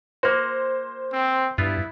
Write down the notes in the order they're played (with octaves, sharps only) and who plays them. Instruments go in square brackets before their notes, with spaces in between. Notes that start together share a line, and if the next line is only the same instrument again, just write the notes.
[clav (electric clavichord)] A#3 F#4 [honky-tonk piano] C5
[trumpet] C4
[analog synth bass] G2 [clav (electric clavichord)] B3 F4 [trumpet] E4